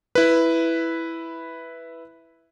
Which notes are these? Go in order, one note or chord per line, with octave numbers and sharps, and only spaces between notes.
E4 B4